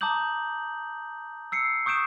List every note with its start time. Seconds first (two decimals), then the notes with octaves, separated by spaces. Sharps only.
0.01 A5 A#5 D6 D#6 G6 F#7
1.52 E6 C7 C#7
1.86 C#6 D#6 G6 D7 E7